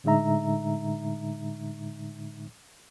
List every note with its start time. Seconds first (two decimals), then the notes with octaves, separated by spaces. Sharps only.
0.04 A2 D3 G#3 D#4 E5 A#5